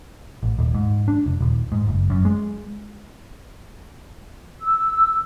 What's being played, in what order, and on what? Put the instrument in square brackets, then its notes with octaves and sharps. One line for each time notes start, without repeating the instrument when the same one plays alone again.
[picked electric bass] A1
D#1
G#2
D4
F1
D#1
G#2
F#1
F#2
G#3
[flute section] E6